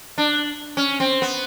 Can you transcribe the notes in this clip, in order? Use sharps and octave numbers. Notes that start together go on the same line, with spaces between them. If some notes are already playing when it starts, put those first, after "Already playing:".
D4
C#4
C4
B3